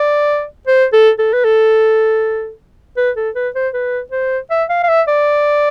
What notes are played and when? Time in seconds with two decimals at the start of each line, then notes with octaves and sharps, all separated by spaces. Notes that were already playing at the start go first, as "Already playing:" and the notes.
Already playing: D5
0.67 C5
0.93 A4
1.19 A4
1.33 B4
1.44 A4
2.97 B4
3.16 A4
3.35 B4
3.55 C5
3.74 B4
4.11 C5
4.50 E5
4.69 F5
4.83 F5
4.89 E5
5.08 D5